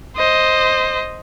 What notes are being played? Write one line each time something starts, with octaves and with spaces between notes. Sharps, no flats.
C5 D#5